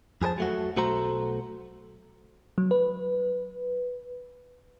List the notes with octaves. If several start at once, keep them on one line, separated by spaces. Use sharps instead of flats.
F2 G#4 B4 C5 A5
F#3 A3 F#4
B1 A3 F#4 A4 C5 A#5
F#3
B4